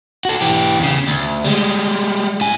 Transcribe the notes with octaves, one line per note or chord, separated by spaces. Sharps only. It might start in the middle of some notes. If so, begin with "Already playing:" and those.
F#4 A4
E3 G4
E2 C#3
D2
G3 G#3
A2 G#5